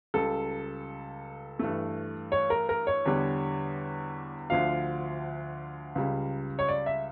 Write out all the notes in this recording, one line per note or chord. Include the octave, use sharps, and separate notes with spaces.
C#2 C#3 G3 A4
G2 E3 A3
C#5
A#4
A#4
C#5
E2 D3 G3
D2 D3 F3 F5
C#2 C#3 G3
C#5
D5
E5